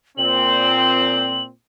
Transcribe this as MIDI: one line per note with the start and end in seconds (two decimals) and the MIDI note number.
0.18 1.49 46
0.18 1.49 60
0.18 1.43 102